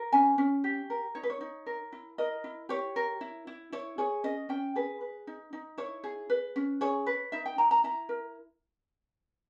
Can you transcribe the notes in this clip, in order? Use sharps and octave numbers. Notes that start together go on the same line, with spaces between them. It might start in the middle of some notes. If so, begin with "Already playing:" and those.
Already playing: A#4
C#4 G#5
C#4
G4
A#4
D#4 C#5
B4
C#5
D#4
A#4
E4
A#4 D#5
E4
G4 C#5
A#4
E4
E4
E4 C#5
G#4 C#5
C#4 D#5
C#4 G5
G#4 B4
B4
D#4
D#4
E4 C#5
G#4
B4
C#4
G#4 C#5
B4
D#4 E5
G5
D#4 A#5
A#5
E4 A#5
A#4